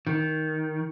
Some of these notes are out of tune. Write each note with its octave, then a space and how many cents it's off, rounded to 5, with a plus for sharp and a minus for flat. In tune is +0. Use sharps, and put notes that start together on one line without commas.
D#3 +10